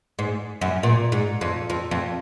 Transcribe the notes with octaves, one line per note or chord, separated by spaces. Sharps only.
G#2
F#2
A#2
G#2
F2
F2
F2